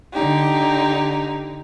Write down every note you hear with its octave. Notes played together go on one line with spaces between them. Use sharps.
D3 D#4 G4